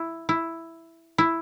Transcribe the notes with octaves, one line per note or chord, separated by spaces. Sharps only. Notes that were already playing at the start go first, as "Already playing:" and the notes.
Already playing: E4
E4
E4